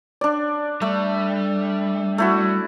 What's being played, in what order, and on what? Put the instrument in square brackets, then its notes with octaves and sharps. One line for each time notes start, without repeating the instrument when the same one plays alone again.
[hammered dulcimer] D4 D5
[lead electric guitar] G3 [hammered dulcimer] A3
[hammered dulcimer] A3 E4 F#4